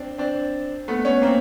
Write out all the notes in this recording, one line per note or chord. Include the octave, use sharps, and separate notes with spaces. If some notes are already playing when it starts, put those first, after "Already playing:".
Already playing: C4 D4
C4 D4
A3 B3
B3 C#4
A#3 C4